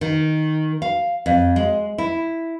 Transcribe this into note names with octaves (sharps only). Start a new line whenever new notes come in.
D#3
F5
F2
G#3
E4